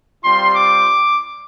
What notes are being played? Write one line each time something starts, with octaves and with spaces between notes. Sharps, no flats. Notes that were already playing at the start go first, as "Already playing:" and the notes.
G3 C4 F4 C6
D6